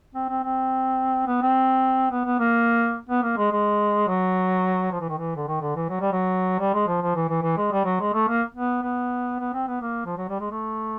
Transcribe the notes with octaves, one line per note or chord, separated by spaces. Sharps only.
C4
C4
C4
B3
C4
B3
B3
A#3
B3
A#3
G#3
G#3
F#3
F3
E3
D#3
E3
D3
D#3
D3
E3
F#3
G3
F#3
G3
G#3
F3
F3
E3
E3
E3
G#3
G3
F#3
G#3
A3
A#3
B3
B3
B3
C4
B3
A#3
F3
F#3
G3
G#3
A3